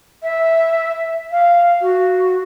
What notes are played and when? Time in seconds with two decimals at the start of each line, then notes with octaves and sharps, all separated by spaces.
0.23 E5
1.31 F5
1.81 F#4